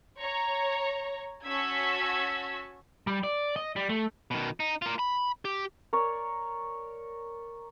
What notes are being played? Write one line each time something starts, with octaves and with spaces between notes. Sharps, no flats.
C#5 A#5
C#4 F#4 A5 E6 G#6 B6
G3
D5
D#5
G3
A3
B2 D#3
D#4
A#3 F4
B5
G4
A#4 C#5 D5